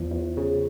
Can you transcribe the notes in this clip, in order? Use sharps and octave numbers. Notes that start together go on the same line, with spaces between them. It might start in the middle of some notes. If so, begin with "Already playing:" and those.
Already playing: E2 F3
E2
C#3